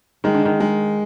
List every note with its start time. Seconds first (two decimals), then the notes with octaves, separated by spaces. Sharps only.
0.24 D#3 G#3
0.34 D3
0.45 D#3
0.60 G#3